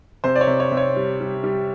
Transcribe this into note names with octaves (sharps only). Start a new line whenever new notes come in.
C3 C5
D5
C#5
C3
C#5
C3
C#5
G3
G3
G3